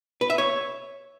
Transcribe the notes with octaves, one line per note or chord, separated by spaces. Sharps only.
B4
E5
C#5